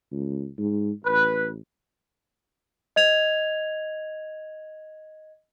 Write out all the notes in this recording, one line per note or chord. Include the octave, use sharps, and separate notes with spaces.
C#2
G#2
A1 B4
D#5 G#6 F7